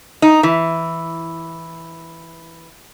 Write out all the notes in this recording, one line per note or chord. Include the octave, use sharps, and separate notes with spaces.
D#4
E3